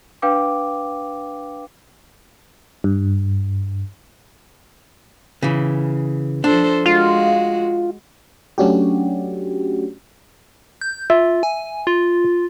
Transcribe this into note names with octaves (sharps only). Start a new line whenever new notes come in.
D4 B4 F5 G5 D6
G2
C#3 E3
F3 D4 A4 C5
G#3 F4 F#4
F#3 A3 C#4 D4 F#4 G4
G6
F4 E5
G#5
F4